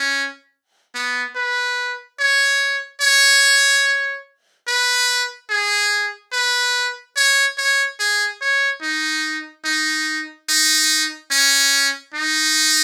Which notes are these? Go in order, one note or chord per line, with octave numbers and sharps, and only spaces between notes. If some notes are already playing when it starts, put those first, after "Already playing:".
Already playing: C#4
B3
B4
C#5
C#5
B4
G#4
B4
C#5
C#5
G#4
C#5
D#4
D#4
D#4
C#4
D#4